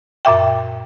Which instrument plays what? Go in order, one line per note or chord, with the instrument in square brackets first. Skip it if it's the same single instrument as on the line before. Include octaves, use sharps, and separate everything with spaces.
[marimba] F#2 A#2 E5 G5